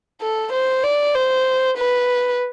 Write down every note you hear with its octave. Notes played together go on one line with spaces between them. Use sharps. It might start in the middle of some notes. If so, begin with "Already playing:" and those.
A4
C5
D5
C5
B4